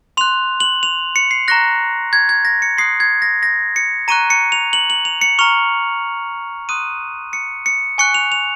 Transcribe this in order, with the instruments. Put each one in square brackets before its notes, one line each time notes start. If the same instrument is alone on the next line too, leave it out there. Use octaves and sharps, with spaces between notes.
[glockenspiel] C6 F#6 F7
F#7
F7
C#7
C7
A#5 C#6 F#6 A#6
G#6
G#6
A#6
C#7
C6 D#6 F#6 C7
G#6
A#6
A#6
C#7
A#5 C#6 F#6 D#7
C#7
F7
F#7
F#7
F7
C#7
A#5 C#6 F6 F7
C6 D#6 F#6 D#7
C#7
C#7
G#5 C#6 F#6 C#7
F7
F7